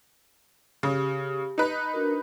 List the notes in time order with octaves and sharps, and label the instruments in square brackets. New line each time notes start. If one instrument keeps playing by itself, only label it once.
[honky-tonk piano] C#3 [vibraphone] G4
[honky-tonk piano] D#4 B4
[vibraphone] D4 F#4 A#4